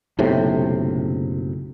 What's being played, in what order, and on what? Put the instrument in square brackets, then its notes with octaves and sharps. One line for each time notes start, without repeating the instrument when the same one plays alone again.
[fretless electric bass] F#1 B1 A2 C3